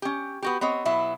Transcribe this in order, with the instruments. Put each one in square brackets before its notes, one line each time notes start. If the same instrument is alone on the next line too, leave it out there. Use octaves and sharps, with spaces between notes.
[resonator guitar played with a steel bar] C#4 G4
B3 F#4 G4
B3 C4 C#5 D#5
B2 F#3 E4 E5